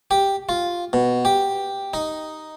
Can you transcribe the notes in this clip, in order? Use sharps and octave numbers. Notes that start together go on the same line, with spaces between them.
G4
F4
B2
G4
D#4